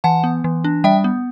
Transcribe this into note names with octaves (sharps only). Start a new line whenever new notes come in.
E3 F#5 A5
B3
E3
D4
G3 E5 G5
B3